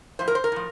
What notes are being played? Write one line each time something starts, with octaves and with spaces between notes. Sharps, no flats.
A2 F3 C5
A#4
C5
A#4
A2 F3